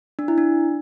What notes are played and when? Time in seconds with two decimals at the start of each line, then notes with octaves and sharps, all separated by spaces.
0.19 D4
0.28 E4
0.38 D4